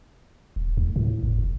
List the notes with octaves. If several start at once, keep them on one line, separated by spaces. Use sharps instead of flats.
D1
D2
A2
G1
F1